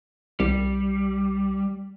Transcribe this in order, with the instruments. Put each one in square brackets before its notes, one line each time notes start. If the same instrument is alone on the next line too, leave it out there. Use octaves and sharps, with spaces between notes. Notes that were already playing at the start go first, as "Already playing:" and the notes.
[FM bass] C2 [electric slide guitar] G3